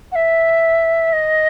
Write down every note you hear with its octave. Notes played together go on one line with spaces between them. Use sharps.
F#5
E5
D#5